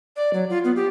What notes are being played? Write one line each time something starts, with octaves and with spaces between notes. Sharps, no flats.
D5
F#3
F4
B3
G4